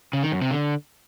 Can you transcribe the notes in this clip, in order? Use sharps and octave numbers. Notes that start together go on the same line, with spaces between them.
C#3
D#3
F#2
C3
D3